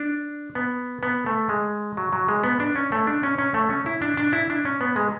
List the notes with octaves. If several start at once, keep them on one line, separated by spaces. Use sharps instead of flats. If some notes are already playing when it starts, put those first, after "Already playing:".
Already playing: D4
B3
B3
A3
G#3
F#3
F#3
G#3
B3
D4
C#4
A3
D4
C#4
C#4
A3
C#4
E4
D4
D4
E4
D4
C#4
B3
G#3